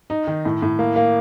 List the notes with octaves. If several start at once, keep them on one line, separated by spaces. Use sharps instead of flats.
D#4
D#3
A2
A2
A#3
A#3